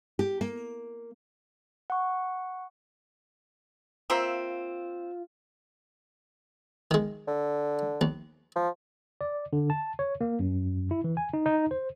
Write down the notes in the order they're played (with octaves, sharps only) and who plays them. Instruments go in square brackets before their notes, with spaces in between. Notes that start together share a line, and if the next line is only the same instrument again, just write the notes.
[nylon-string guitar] G4
A#3
[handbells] F#5 C#6
[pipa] A#3 C4 E5 [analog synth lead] F4
[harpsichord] D#3 G#3
[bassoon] D3
[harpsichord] D#2
[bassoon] F3
[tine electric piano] D5
D3
A5
C#5
A#3
F#2
E4
E3
G#5
D#4
D#4
C5